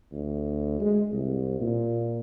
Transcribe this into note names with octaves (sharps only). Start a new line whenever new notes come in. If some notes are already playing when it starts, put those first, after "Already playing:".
D2
G#3
C2
A#2